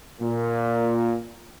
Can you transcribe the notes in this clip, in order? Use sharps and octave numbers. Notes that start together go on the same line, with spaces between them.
A#2